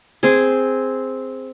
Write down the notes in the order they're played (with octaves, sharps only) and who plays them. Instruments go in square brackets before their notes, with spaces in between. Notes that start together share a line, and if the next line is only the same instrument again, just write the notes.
[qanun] C4 G#4